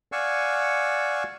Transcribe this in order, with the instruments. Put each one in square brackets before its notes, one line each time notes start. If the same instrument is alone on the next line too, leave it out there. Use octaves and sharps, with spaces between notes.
[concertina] D5 F5 F#5 G#5 C#6 E6